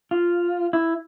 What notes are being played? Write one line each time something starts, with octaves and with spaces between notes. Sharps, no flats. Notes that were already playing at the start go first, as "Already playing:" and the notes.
F4
E4